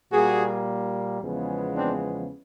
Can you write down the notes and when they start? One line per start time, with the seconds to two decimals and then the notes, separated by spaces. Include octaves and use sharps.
0.12 A#2 G3 A#3 F#4 G#4
1.21 E2 C#3 F3 G#3 B3
1.75 C4 D4